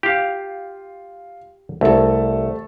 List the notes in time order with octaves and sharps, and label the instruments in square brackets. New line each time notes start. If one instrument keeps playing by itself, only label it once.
[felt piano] F4 [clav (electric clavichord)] G4 F5
[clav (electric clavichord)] C2 [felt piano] A3 A4